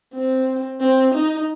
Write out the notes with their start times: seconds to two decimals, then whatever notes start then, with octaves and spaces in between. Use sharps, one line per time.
0.14 C4
0.81 C4
1.14 D#4